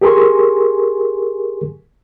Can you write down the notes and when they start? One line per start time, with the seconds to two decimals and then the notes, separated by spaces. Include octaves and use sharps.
0.01 G4 G#4 A#4 G#5 C6 C#6